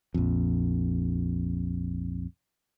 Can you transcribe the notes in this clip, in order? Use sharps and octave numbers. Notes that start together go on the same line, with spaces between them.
A#1 F2